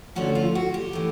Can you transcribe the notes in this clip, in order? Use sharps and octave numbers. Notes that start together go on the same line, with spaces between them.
D2 D3 F3 A3 C#4 F#4
F4
F#4
G4
E3 A3